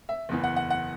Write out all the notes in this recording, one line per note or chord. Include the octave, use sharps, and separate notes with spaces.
E5
F#1 E2 E3
F#5
F#5
F#5